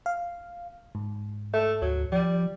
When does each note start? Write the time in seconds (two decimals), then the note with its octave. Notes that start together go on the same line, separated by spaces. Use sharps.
0.06 F5
0.95 G#2
1.53 A3
1.82 D2 F#3
2.12 F3 G3